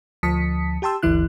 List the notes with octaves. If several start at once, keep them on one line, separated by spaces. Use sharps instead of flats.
D2 F3 A5 D#6 B6 C#7
G4 G5 A5 C6 E6
G1 D2 E3 E4 F#6